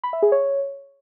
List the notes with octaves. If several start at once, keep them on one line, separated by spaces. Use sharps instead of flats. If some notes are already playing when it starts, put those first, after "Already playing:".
B5
E5
G#4
C#5